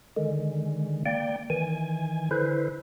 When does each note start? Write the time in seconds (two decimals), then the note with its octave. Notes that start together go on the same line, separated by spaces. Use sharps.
0.17 D3 D#3 G#3
1.06 A#3 D5 G5
1.50 D#3 E3 G#5
2.31 D3 E4 B4 C5